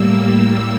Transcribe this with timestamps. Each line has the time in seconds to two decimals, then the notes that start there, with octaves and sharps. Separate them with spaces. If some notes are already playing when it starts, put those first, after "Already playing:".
Already playing: A2 G3 A#3 E6
0.29 E6